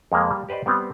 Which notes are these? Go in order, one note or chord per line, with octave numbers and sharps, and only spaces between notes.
F2 G#3 A#3
G3 A#3
G4 B4 C5 D5 D#5
G3 B3 C4